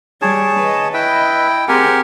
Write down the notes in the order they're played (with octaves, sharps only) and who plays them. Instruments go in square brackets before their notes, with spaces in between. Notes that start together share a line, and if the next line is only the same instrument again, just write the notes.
[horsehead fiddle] G3 [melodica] G#4 C#5 A5
[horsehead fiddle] B4 D#5
[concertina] E4 G5 [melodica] B4 E5 [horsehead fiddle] D#5
[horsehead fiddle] C4 G#4 [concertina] G4 A#4 G#5 [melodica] F#5